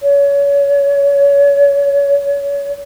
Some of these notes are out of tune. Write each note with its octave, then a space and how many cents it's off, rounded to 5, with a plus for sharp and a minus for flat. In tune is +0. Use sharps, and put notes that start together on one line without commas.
C#5 +30